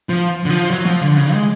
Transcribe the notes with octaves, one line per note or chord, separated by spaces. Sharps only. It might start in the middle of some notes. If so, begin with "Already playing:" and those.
F3
D3
F3
F#3
F3
D3
C#3
G#3